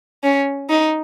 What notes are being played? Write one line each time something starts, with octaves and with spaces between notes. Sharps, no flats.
C#4
D#4